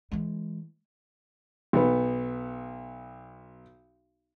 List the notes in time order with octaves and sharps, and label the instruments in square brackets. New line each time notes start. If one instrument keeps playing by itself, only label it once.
[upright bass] E3 G#3
[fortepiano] B1 B3